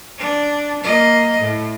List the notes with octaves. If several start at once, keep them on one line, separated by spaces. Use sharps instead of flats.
D4
A#3 D#5
A2